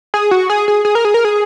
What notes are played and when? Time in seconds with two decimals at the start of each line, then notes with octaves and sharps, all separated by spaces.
0.14 G#4
0.31 F#4
0.50 G#4
0.68 G#4
0.85 G#4
0.95 A#4
1.05 G#4
1.14 A#4
1.25 G#4